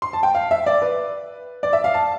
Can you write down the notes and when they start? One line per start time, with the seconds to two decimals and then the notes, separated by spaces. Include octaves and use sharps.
0.02 C6
0.13 A5
0.23 G5
0.35 F5
0.51 E5
0.66 D5
0.82 B4
1.63 D5
1.73 E5
1.84 F5
1.94 A5